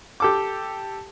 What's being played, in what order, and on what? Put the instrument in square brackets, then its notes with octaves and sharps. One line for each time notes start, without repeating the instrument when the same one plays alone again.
[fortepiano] G4 A4 D6